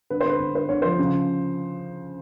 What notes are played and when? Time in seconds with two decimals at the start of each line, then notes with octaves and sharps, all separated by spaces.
0.10 D3 B4
0.21 C5
0.25 D3 B4
0.40 D3
0.54 D3 C5
0.69 D3 C#5
0.82 F3 C5
0.99 C#3